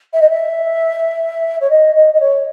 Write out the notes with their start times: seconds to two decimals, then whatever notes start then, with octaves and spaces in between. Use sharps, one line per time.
0.13 E5
0.21 D#5
0.30 E5
1.61 C#5
1.70 D#5
1.95 D#5
2.13 D#5
2.20 C#5